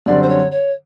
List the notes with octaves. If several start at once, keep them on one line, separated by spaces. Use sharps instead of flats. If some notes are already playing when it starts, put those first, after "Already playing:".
F#2 D3 G3 C4 D5
C5
C#5
C#5